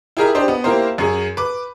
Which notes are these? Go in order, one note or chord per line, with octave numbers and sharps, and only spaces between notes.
E4 G4 G#4 A#4 D#5 E5
D4 G4 C5 D#5
B3 B4 D#5
A#3 E4 G4 A#4 C5
F#2 G#4
B4 D6